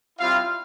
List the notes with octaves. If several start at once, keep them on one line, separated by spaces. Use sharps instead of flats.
G3 C4 E4 F4 F5